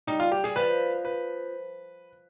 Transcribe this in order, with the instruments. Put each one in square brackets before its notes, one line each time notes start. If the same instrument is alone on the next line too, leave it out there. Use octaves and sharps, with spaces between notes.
[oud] G3 [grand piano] D#4
[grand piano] F4
G4
[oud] G3 [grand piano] G#4
[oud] F3 [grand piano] B4
[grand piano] B4